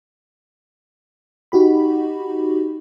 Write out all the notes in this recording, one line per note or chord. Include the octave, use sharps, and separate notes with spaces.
D#4 F#4 G4 B5